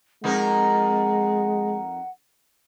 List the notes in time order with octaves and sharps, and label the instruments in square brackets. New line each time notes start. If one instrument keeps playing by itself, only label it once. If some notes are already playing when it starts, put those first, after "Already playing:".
[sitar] F2 D#4 A#4 [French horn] G#3 [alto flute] F#5